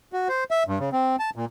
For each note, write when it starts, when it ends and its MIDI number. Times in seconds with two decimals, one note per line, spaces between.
0.13 0.28 66
0.29 0.44 72
0.51 0.63 76
0.67 0.79 43
0.80 0.90 49
0.93 1.16 60
1.19 1.30 81
1.36 1.45 46